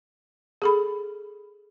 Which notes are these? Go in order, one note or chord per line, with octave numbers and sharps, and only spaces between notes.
G#4 A4 B5